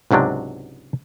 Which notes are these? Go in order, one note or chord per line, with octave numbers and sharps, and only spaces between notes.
C#2 G#2 C3 F#3 D4